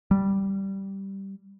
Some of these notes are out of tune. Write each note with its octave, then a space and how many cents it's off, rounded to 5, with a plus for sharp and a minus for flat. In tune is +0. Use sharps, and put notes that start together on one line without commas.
G3 -10